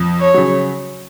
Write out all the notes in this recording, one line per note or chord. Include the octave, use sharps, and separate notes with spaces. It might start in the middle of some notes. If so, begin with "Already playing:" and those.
Already playing: F2
C#5
C#3 F#3